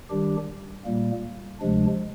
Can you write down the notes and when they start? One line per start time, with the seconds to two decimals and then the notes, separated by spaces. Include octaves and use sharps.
0.10 D#3 G3 D4 G4
0.85 A#2 G3 A#3
1.60 D2 C3 F3 G#3 D4